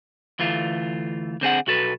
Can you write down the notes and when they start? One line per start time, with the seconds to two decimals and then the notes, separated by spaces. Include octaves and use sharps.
0.39 D2 E3 A3 F4
1.41 D3 C4 G#4 F#5
1.67 B1 F#4 A4 B4